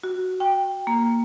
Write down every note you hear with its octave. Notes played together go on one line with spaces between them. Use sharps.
F#4
G5
A#3